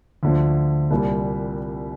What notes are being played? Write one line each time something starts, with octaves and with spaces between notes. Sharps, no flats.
D2 D3 F3
C2 A#2 G3